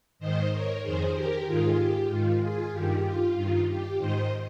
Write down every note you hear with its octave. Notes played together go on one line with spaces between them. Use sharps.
G#2 D#3 C5 D#5
A#4 C#5
F2 D#3 G#4 C5
G4 A#4
G#2 D#3 F4 G#4
G4
G#2 D#3 F4
F4 G#4
G2 D#3 G4
F4
G2 D#3
G4
G#2 D#3 C5 D#5